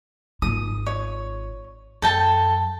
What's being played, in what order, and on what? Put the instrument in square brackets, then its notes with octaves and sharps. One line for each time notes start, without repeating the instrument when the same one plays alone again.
[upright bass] G#1 F4 [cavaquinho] D#6
[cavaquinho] C#5
[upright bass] F#2 [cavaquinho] A4 G5 A5